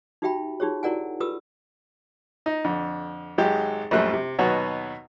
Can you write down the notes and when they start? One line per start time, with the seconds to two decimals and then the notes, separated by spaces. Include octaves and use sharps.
0.22 D#4 F#4 G4 E5 G5 B5
0.60 D#4 F4 G4 G#4 C#5
0.83 E4 F#4 A#4 D5 F#5 G#5
1.20 F4 G4 A4 B4 D#6 E6
2.46 D#4
2.64 F2 D3
3.38 G#1 F#3 G#3 G4
3.91 A#1 F#2 F3 G3 A3 F#6
4.13 C3
4.39 D#2 B2 F#3 B3 F#4 C#5